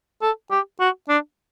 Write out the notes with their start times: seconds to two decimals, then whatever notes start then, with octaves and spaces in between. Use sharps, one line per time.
0.22 A4
0.51 G4
0.80 F#4
1.09 D4